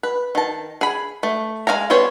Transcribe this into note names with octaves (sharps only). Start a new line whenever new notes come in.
B4
D#3 A5
G#4 B5
A3
G#3 E4 F5 G#5 A#5
G3 B3 G#4 C5 C#5